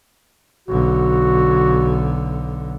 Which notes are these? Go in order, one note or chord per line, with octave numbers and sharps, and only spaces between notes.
B1 D3 F#4